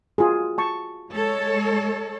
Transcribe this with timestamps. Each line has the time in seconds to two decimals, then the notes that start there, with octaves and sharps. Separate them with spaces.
0.18 F4 F#4 G#4
0.58 A5 C#6
1.14 G#3 A4 C#5